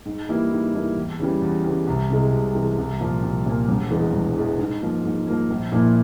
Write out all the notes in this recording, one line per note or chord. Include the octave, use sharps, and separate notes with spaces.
G#2
E3 G3 A#3 E4
G#2
E3 G3 A#3 E4
E2
C#3 E3 G3
E2
C#3 E3 G3
C2
C3 E3 G#3
C2
C3 E3 G#3
C2
A#2 F3 A#3
C2
A#2 F3 A#3
E1
E2 E3 G#3
E1
E2 E3 G#3
G#2
F3 A#3
G#2
F3 A#3
A#1
A#2 F3 A#3 E4